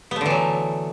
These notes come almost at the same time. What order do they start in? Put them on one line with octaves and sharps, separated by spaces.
B3 A3 D3 E3 F#3